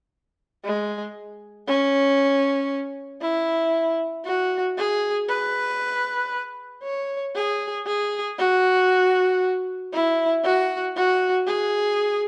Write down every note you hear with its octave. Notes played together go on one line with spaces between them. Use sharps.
G#3
C#4
E4
F#4
G#4
B4
C#5
G#4
G#4
F#4
E4
F#4
F#4
G#4